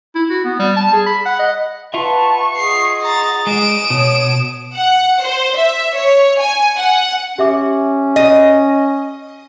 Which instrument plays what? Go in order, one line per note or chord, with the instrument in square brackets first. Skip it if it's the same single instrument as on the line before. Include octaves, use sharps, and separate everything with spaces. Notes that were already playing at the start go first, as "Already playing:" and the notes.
[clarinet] E4
F#4
B3
G3
A5
G#4
B5
F#5
D#5
[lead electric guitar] F4 E5 [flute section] B4 F#5 A5 [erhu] C#6
[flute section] G#4 D#5 F#5 [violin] C7
[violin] A#5 A6
[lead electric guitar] G#3 [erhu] D#6 [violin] D7 E7
[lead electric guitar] B2 [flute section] C#5
[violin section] F#5
C5
E5
C#5
G#5
F#5
[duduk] C#4 [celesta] G4 E5 D6
[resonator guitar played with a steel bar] D#5